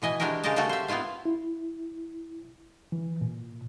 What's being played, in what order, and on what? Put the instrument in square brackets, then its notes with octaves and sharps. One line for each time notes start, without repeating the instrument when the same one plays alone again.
[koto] B2 E3 D#5 G#5
G#3 D4 E4 F#4 G4 A#4
C#3 G#3 G4 A#4 D#5 A5
C#3 G3 A3 A#3 F#4 A4
C5 E5
B3 C4 E4 F4 F5
[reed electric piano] E4
E3
A#2